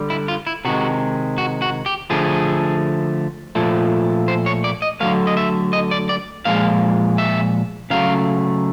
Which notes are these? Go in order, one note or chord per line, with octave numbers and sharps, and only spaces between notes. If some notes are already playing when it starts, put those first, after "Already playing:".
Already playing: D3 G3
E4
F4
E4
C3 D#3 G#3 F#4
F#4
F#4
G4
D3 F3 A3 G#4
A#2 F3 A3
C5
C#5
D5
D#5
D3 F#3 A3 F5
D#5
E5
D#5
D5
D5
A#2 F3 G#3 F5
E5
C#3 F#3 A3 F5